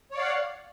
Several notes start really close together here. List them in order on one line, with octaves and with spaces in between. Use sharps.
C#5 D5 F5 F#5